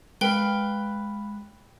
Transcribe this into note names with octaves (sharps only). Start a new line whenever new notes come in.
G#3 B4 F5 G5 G7